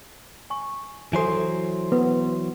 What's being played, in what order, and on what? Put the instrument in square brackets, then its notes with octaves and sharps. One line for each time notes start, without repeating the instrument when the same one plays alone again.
[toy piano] G#5 C#6
[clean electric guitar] E3 F#3 C5 [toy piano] A4 G#5
[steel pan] B3 [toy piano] B4